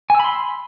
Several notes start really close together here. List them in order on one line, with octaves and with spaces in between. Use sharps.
G#5 E6 B5 C6